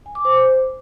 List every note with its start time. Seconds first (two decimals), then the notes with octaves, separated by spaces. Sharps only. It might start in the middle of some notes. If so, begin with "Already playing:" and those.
0.06 G#5
0.15 D6
0.25 C5